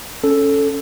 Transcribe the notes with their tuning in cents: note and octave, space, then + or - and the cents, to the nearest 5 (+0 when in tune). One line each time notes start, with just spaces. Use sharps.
C#4 +5 A4 +0